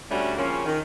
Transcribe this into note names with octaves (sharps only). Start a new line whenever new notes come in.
D2 G3 A3 C#4 D4 F#4
C#3 F3 A#3 C4 C#4
D#3